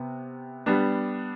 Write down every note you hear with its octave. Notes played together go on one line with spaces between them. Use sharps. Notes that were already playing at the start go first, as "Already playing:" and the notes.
Already playing: C3 B3
G3 B3 D4